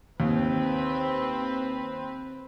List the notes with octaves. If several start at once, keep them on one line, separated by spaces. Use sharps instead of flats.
D#2 C4 B4